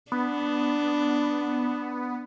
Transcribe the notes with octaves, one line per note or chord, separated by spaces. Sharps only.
B3 D4